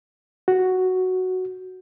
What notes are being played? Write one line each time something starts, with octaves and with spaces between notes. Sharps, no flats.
F#4